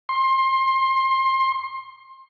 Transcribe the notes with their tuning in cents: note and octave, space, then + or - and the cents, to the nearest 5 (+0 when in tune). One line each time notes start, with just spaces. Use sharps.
C6 +25